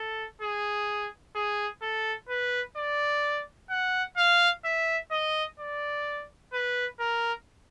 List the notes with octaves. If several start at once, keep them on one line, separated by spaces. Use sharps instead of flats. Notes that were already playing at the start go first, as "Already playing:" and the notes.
Already playing: A4
G#4
G#4
A4
B4
D5
F#5
F5
E5
D#5
D5
B4
A#4